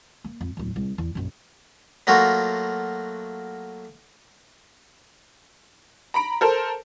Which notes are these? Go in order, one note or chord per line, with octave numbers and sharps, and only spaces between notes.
A#3
F2
D1 E2
C2
E2
A#1 F#2
F#3 A3 A#3 F4 F#4
A#5 B5 D7
A4 A#4 C5